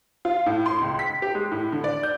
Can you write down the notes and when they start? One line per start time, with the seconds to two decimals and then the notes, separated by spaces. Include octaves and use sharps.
0.25 F4
0.46 A2
0.66 C6
0.81 C#2
0.99 B6
1.22 G4
1.35 G#3
1.51 A2
1.72 D3
1.84 D5
2.03 G6